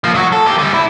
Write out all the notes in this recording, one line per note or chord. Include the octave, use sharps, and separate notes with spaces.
F3 A#3
F#3 F#4
A4
A#3 G4
D3 G3
E4